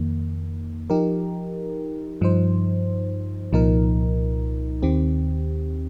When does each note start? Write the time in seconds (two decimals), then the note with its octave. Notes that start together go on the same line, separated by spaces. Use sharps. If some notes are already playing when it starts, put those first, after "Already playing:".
Already playing: F2 D#3 A#3
0.90 F3 D#4 G4 A#4
2.21 G2 F3 D#4 C5
3.52 C2 A#2 F3 D#4 A#4
4.82 D#2 D#3 C4 G4